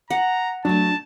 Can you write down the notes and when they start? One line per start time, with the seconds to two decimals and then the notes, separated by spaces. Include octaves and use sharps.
0.10 F#5 A#5
0.65 F#3 A3 D4 A5